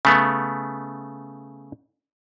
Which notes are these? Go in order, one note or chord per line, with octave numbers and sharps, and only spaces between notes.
C#3 A3 B3